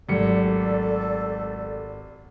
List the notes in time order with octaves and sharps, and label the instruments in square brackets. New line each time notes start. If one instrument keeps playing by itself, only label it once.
[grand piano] G#1 G4 C#7 [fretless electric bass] F#3 G#3 A3 [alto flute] A4 [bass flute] D5